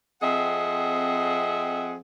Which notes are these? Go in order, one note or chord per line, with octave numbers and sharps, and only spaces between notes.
F2 C4 G#4 D#5 E5 F#5